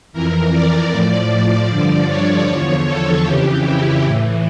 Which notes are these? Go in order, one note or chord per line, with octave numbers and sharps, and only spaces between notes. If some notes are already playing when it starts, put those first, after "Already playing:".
F2 E3 A#4
D5
A2 F3
G2 D3 F3 D5
C#5
E2 D3 F3 C#5
A4
F2 C#3 E3 G4
E4
A2 E3